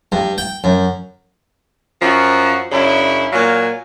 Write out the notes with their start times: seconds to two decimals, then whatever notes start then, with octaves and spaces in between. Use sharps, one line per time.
0.12 G2
0.38 G5
0.64 F#2
2.02 F#2 F3 F4 F#4
2.72 F#2 C#3 D4 E4
3.33 A#2 F#3 F5 G#5